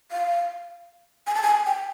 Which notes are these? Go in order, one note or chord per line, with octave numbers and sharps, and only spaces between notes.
F5
G#5
A5
G#5
G5